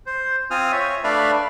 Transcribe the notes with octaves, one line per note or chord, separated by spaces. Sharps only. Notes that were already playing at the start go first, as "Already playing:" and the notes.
C5
C4 F4 G#5 D#6 F6
C#5 E5
A3 D4 B4 D5 E5 F5